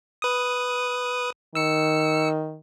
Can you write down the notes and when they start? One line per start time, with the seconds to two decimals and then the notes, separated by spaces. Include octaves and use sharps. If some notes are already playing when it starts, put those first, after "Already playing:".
0.22 B4 D#6
1.55 D#3 E6 C#7